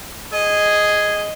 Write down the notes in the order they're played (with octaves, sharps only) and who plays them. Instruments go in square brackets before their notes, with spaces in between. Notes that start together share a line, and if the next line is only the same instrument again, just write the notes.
[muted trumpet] G#4 [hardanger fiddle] D#5